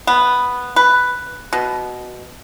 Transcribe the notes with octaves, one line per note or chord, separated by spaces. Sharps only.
B3
B4
B2